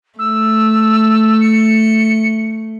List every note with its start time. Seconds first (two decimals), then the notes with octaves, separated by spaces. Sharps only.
0.19 A3 E6
1.41 C#7